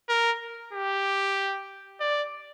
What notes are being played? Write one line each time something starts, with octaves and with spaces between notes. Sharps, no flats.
A#4
G4
D5